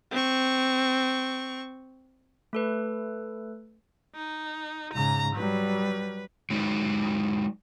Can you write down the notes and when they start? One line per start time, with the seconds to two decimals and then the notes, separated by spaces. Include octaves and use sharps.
0.12 C4 C#6
2.53 A3 A4 B4
4.15 D#4
4.93 G#2 C#3 A#5
5.36 F#3 G3 B4
6.50 F#3 G#3 D#4 B4